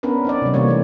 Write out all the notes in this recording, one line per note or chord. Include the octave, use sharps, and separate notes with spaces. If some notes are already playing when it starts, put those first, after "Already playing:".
B3 C#4 D4 A#4 B4
C4 D#4 D5
C3 G3
C3 E3 A#3 C4 C#5
G#3 A3